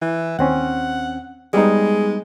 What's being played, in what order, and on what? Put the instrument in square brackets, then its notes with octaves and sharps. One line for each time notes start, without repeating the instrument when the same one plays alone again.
[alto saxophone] E3
[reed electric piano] D#2 C4 C#4 [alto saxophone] F#5
[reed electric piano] G3 B3 D#4 [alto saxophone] G#3